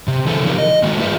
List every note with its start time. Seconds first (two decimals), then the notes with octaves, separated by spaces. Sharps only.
0.08 C3
0.27 D3 E3 E4 G#4 A4
0.46 C#3 F3 D#4 F4 G4 A#4
0.58 D#5
0.83 D#3 G#3 A3 F#4
1.00 F4 G#4 B4 E5